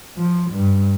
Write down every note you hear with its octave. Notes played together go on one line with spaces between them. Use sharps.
F3
G2